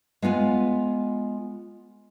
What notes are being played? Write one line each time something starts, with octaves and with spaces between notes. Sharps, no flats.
G#3 B3 F4 G#5